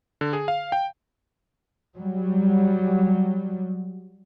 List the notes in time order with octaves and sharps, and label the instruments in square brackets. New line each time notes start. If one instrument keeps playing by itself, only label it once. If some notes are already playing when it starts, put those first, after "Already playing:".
[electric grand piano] D3
G#4
F5
G5
[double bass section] F#3 G3